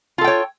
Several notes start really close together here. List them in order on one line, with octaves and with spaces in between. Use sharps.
F4 A4 G5 C#5